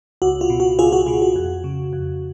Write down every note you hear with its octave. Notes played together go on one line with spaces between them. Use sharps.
C#2 F#4
F4
B2
F#4
C#2 F4 G#4
F#4
B2 F4
F#4
F2
C#3
F2